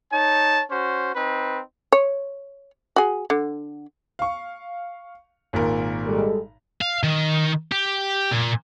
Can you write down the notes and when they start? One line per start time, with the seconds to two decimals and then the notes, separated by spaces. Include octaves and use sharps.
0.12 D#4 C#5 A5
0.71 C#4 F#4 C5
1.15 C4 D#4 B4
1.92 C#5
2.96 F#4 G#4
3.30 D3
4.19 F5 C#6
5.53 G#1 A#2 A#4
6.05 G3 G#3 A4
6.81 F5
7.03 D#3
7.72 G4
8.32 A#2